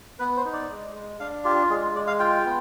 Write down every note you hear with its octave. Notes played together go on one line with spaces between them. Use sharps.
B3 B4
C5
D#4
D5
G#3
G#3
D4 F5
F4 G4
G#3 G#4
G#3 D5
F5
F4 G5
B3